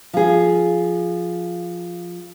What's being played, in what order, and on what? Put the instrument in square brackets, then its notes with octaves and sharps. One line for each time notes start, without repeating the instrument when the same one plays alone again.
[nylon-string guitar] F3 G#4